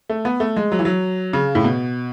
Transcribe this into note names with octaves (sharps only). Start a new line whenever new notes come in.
A3
B3
A3
G#3
F#3
E3
F#3
C#3
A2
B2